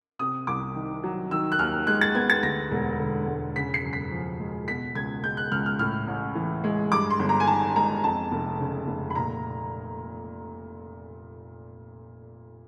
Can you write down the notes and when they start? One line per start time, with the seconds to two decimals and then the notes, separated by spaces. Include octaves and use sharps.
0.19 C3 D#6
0.47 C2 D6
0.75 D#3
1.04 F#3
1.31 D#3 E6
1.52 F#6
1.59 D#2 F6
1.87 G#3 F#6
2.01 A6
2.15 B3 G#6
2.30 A6
2.43 D2 A#6
2.71 E1
2.99 D3
3.27 E1
3.56 C#3 B6
3.74 C7
3.83 F#2
3.93 B6
4.11 F3
4.40 G#3
4.68 B2 B6
4.95 C#2 G#6
5.23 G#3 G6
5.37 F#6
5.51 C#2 F6
5.66 F6
5.79 A2 F6
6.07 A1
6.35 E3
6.64 G#3
6.92 G2 D6
7.10 C6
7.19 G1
7.29 A#5
7.40 G#5
7.47 D#3 A5
7.76 G#3 A#5
8.04 F2 A5
8.32 F1
8.60 C#3
8.87 F1
9.10 B5
9.15 A#2 A#5